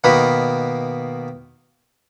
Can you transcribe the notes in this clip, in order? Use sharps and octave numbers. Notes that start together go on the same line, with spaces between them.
B2 D#3 A#3 B4